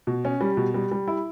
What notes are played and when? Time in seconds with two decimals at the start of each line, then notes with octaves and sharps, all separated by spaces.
0.07 B2
0.25 C#4
0.41 G3
0.57 B2
0.74 G3
0.92 G3
1.08 E4